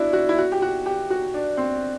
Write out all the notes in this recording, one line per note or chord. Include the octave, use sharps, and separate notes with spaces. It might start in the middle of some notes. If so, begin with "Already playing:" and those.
Already playing: D4 E4 F#4
F#4
E4
F#4
G4
F#4
G4
F#4
D4
C4